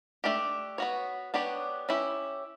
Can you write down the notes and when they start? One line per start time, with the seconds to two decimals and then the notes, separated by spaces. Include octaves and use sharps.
0.24 A3 D4 G4
0.78 B3 F#4 C#5
1.34 B3 D4 G4 C#5
1.89 C#4 E4 G4